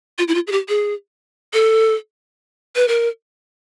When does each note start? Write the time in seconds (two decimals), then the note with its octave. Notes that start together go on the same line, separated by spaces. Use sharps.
0.18 F4
0.28 E4
0.35 F4
0.47 G#4
0.52 G4
0.69 G#4
1.53 A4
2.76 B4
2.88 A#4